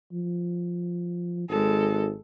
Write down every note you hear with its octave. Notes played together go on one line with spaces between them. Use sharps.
F3
G#1 G#3 A4